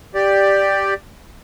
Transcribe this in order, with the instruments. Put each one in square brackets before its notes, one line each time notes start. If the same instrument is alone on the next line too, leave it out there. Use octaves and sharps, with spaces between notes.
[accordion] G4 D5